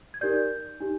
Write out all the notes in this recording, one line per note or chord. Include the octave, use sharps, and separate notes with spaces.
G#6
D#4 G4 A#4 D5 G6
D#4 G4